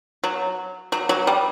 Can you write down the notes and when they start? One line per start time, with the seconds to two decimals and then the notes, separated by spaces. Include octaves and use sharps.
0.24 F#3
0.92 F#3
1.09 F#3
1.27 G3